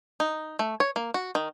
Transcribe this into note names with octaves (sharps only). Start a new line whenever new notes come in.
D#4
A3
C#5
A#3
F#4
D#3